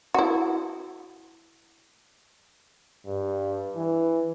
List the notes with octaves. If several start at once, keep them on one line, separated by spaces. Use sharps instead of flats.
E4 F#4
G2
E3